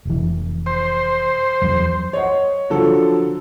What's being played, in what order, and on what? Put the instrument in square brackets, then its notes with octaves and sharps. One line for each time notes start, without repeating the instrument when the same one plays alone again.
[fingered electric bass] F1 E3
[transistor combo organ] C5
[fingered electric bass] E2 F#3
[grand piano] C#5 D#5 F#5
D3 F3 F#3 A4